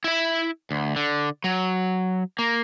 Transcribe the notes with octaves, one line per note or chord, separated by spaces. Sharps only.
E4 E5
D2
D3
F#3
A#3